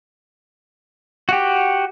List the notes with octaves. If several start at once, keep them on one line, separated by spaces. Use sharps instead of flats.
F#4 G4